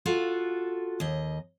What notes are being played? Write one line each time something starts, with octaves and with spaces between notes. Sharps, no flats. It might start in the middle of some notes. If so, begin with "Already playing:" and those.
F4 F#4 A4
D#2 D#5